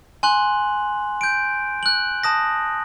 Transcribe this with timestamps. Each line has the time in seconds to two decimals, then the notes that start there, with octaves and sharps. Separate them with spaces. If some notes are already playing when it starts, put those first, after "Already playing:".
0.23 G#5 C6 F#6 F#7
1.21 G6 D7
1.83 F#6 F#7
2.24 A5 D#6 A#6